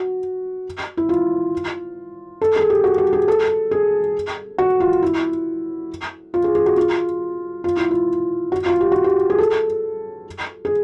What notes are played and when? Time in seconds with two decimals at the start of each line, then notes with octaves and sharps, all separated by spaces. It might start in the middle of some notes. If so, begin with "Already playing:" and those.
Already playing: F#4
0.97 E4
1.09 F4
2.41 A4
2.56 G#4
2.70 G4
2.84 F#4
2.98 G4
3.13 G#4
3.28 A4
3.71 G#4
4.58 F#4
4.80 F4
5.02 E4
6.34 F4
6.44 G#4
6.55 G#4
6.66 F#4
6.77 F4
7.64 F4
7.77 E4
7.91 F4
8.52 F#4
8.66 F4
8.81 G4
8.92 F#4
9.04 G4
9.30 G#4
9.38 A4
10.65 G#4